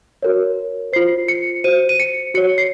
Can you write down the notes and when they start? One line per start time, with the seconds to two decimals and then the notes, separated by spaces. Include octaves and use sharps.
0.23 F#4 A#4 C#5
0.93 F4 C5 C7
1.28 C#7
1.64 F#4 C5 D#7
1.89 D#7
2.00 C#7
2.34 F#4 C#5 C#7
2.58 C7